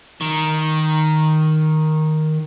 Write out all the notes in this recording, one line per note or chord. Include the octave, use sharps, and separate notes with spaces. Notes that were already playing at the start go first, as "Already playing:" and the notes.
D#3